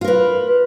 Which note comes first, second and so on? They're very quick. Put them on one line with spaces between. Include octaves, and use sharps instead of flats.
F4 A#4 B4